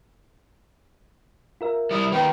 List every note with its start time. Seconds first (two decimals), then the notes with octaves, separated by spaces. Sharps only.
1.61 F4 A#4 E5
1.91 G3 E4 D#6
2.12 D#3 A#3 B3 D#4 B4 G5